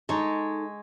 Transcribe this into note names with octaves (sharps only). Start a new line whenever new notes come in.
G#3 D#4 A4 C#5